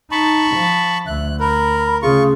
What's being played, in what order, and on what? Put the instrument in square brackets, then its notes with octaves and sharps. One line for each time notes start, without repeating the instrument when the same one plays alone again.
[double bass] D#4 [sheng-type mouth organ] A5 B5 C#6
[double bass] F3
[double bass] D2 [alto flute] E5 [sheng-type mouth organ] F#6
[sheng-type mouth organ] A#4 [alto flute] B5
[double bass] C#3 A3 [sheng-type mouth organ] F4 C#6 [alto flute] G#4